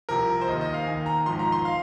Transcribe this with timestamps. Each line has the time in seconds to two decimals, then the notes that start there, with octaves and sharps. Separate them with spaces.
0.09 C2 C3 F3 A#4
0.41 C5
0.48 D#2 D#3 D#5
0.61 D#5
0.74 F5
0.87 D#2 D#3 G#5
1.06 A#5
1.26 G#1 G#2 F3 C6
1.39 A#5
1.52 C6
1.65 F5